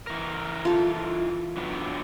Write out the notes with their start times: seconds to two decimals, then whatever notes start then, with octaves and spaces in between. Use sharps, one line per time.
0.07 E3 A#4
0.65 F4 A4
1.57 D3 F#3 B3